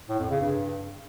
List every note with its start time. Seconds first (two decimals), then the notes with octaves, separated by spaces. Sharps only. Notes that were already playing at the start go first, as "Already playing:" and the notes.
0.09 A2
0.20 F2
0.30 C#3
0.41 G2